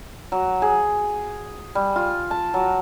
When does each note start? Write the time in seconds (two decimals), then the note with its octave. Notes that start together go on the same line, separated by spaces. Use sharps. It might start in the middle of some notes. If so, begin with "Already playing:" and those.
0.32 F#3
0.62 G#4
1.75 G3
1.96 F4
2.31 A5
2.54 F#3